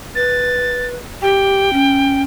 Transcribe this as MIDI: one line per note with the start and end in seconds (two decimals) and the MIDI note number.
0.15 0.95 71
0.15 0.86 93
1.22 1.70 67
1.22 2.22 79
1.73 2.24 61